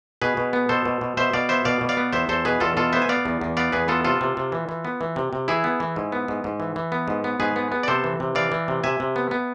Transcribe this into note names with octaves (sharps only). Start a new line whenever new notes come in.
B2 G#4 B4
B2
B3
B2 A4 C5
B2
B2
B2 C5 E5
B2 D5 F5
B3 C5 E5
B2 D5 F5
B2
D5 F5
B3
E2 C5 E5
E2 A4 C5
B2 G#4 B4
E2 F4 A4
B2 F4 A4
B3 C5 E5
G#5
B3 D5 F5
E2
E2
B3 D5 F5
E2 G#4 B4
B3 F4 A4
C3 F4 A4
C3
C3
E3
E3
B3
E3
C3
C3
E3 E4 G#4
B3
E3
G#2
B3
G#2
G#2
E3
E3
B3
G#2
B3
G#2 G#4 B4
B3
B3
D5
C3 A4 C5
E3
C3
E3 D5 F5
E3
C3
C3 E5 G#5
C3
B3
B3